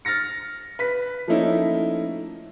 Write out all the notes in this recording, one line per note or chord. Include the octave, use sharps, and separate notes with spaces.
F6 A6 A#6 C#7
B4 B6
F3 A3 A#3 C#4 D#4 E4